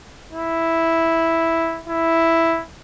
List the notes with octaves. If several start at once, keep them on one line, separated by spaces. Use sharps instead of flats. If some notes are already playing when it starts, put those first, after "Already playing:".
E4
E4